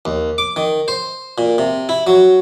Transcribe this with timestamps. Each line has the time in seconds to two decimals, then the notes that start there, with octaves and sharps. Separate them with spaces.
0.05 D#2
0.38 D6
0.56 D#3
0.88 C5
1.38 A#2
1.58 C3
1.89 E4
2.07 F#3